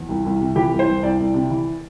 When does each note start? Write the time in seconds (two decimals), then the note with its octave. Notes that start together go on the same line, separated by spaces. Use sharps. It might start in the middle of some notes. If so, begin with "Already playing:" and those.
Already playing: E2
0.09 C2
0.24 C2
0.40 C3
0.55 E3 G4
0.72 C2
0.79 C5
0.87 C2
1.03 C2 D5
1.19 C2
1.34 C3
1.50 E3